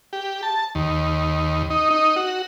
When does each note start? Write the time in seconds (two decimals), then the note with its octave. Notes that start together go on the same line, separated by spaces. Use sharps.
0.13 G4
0.43 A5
0.75 D#2
1.70 D#4
1.91 D#4
2.16 F#4